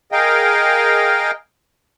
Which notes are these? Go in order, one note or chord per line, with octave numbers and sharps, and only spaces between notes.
G#4 A#4 D#5 F5 G5